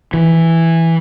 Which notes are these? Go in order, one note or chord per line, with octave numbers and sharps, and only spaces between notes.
E3